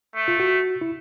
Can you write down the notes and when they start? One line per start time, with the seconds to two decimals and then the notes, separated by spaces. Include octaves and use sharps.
0.15 A3
0.28 F4
0.40 F#4
0.81 E4